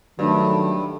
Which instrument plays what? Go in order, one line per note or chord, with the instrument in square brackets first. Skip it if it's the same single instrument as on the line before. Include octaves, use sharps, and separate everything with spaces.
[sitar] G2 [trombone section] D#3 F#3 A3